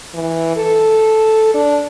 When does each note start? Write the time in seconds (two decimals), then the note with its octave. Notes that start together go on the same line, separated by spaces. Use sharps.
0.14 E3
0.56 A4
1.54 D4